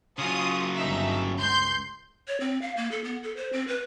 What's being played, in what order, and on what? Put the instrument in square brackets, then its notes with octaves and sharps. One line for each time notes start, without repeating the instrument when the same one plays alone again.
[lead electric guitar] C#3 F#3 [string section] F4 D#6
[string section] G1 D#4 E5
C#2 C6 G6
[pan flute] C#5
C4
F5
A#3
A4
B3
A4
C5
C4
B4